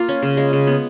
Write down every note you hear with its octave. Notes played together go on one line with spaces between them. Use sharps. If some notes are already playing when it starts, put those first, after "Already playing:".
Already playing: A#3 F4
C#4
C#3
G#3
C#3
B3